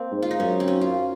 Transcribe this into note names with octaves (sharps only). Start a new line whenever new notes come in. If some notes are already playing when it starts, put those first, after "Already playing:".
Already playing: A#3 C4
G#2
F4
D#4
F#2 C#4
C4
C#4
F4